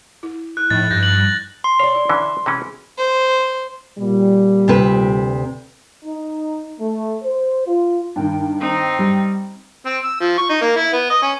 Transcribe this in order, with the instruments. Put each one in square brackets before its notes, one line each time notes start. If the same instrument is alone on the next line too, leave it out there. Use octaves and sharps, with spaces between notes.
[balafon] E4
[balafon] E4 [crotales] F#6
[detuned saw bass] A2 [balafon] F3 D#4 [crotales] A6
[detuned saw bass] G2 [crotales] G6 A#6
[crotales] F#7
[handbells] C6
[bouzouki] C#5 D5 [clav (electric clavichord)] F5
[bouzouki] E4
[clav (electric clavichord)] D3 E3 C#4 [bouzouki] E5
[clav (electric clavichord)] C3 E3 C#4 [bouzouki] G#3
[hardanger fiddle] C5
[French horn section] A#2 G3
[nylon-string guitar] D2 C3 B4
[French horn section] D#4
A3
C5
F4
[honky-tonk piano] G2 D#3 [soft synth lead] G5
[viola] C4 D#4
[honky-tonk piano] G3
[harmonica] C4
E6
F3
C#6
D#4
A#3
E4
B3
D#5
C#4